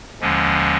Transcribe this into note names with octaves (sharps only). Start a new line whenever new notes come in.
D#2 D3 F3 G#3 C#4